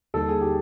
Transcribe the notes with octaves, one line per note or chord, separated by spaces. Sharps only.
D#2 D3 G3 A#3 D#4 A4
G#4
G4